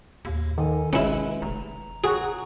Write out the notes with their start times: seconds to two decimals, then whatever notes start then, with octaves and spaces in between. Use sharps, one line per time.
0.25 D#2 A2
0.58 D#3 A4 G#5
0.93 G#1 G#3 C#4 E4 B4
1.42 F1 A#5
2.04 F#4 G#4